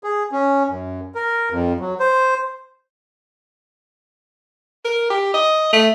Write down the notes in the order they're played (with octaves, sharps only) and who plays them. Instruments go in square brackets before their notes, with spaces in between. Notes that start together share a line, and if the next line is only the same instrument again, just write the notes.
[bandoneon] G#4
C#4
F#2
A#4
F2
F#3
C5
[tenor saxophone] A#4
G4
D#5
A3